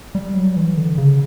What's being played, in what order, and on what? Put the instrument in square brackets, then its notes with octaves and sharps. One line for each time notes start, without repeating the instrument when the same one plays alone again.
[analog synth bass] G3
F#3
E3
D3
C#3